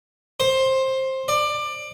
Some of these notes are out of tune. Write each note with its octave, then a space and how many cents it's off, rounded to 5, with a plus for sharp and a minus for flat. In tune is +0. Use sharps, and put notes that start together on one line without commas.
C5 +15
D5 +20